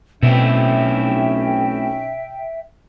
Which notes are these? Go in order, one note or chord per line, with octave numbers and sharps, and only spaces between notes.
B1 B2 A3 C4 C#4 E4 E5 G5